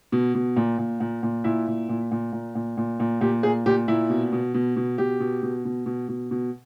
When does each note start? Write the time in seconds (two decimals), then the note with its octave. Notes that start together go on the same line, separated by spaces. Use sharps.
0.12 B2
0.35 B2
0.56 A#2
0.78 A#2
1.00 A#2
1.23 A#2
1.44 A#2 E4
1.68 A#2
1.89 A#2
2.11 A#2
2.33 A#2
2.55 A#2
2.77 A#2
3.00 A#2
3.21 A#2 G4
3.43 A#2 G#4
3.66 A#2 G4
3.88 A#2 E4
4.10 B2
4.32 B2
4.54 B2
4.76 B2
4.98 B2 G4
5.20 B2
5.43 B2
5.65 B2
5.86 B2
6.09 B2
6.31 B2